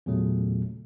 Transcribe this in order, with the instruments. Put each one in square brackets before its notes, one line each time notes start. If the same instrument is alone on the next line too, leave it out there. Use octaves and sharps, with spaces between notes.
[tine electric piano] E2 A#2 C#3 F#3 A3